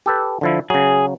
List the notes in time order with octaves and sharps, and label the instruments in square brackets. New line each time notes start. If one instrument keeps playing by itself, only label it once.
[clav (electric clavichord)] G4 A4 B4
D3 F3 E4
[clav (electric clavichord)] C#3 F#3 [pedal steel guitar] G#4